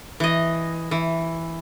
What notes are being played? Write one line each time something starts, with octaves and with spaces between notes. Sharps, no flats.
E3 D#5
E3